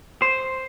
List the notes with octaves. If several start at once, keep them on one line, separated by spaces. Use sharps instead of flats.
C5